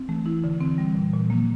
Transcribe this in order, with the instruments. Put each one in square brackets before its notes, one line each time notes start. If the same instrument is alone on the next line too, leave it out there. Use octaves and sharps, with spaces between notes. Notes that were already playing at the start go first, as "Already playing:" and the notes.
Already playing: [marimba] C4
[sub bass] E3 [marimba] A3
[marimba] E4
D3
C4
G3
A#2
A#2
[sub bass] F3 [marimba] A#3